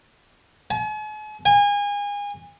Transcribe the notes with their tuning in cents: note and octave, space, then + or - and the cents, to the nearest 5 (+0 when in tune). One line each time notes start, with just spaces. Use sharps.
G#5 +45
G#5 -30